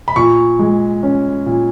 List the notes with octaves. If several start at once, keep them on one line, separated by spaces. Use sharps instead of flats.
B5
A#2 C#6
G#3
C#4
A#2